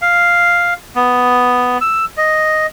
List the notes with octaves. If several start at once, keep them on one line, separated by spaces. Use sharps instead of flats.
F5
B3
E6
D#5